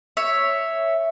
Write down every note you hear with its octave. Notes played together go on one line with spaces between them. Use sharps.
C#5 E5